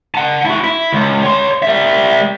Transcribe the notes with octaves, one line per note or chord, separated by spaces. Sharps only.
F#5 A5
E4 F#4
E4
C#2
C#5 C6
G3 E5